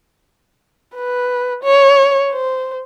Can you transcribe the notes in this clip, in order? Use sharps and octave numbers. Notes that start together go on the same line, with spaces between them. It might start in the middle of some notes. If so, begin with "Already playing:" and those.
B4
C#5
C5